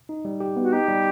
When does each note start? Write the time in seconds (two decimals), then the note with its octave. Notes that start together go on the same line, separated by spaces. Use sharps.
0.09 D#4
0.25 G3
0.40 G4
0.56 B3
0.62 F#4
0.73 D#4 G4
0.88 G3